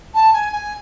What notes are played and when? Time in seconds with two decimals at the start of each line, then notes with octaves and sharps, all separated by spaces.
0.14 A5
0.33 G#5
0.52 G#5